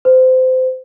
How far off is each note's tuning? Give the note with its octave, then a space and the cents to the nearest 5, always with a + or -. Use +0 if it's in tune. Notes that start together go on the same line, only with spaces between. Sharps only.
C5 -25